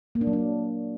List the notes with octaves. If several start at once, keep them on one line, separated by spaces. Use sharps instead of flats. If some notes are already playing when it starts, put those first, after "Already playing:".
A#3
D4
F#3
D4